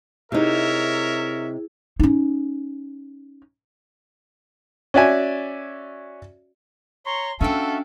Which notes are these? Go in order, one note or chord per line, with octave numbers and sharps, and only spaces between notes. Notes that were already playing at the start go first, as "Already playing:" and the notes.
C3 D#4 E4 G#4 A#4 C#5 E5
C#4 D#4
C#4 F#4 D5 E5 G#5
C#5 A#5 C6 C#6
C#4 D4 F4 F#4 A4 E5 F5 G5